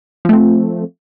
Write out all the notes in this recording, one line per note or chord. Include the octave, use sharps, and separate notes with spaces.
F3 A3 C4